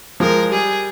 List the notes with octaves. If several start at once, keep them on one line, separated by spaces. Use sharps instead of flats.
F3 G#3 A#4
G3 G#4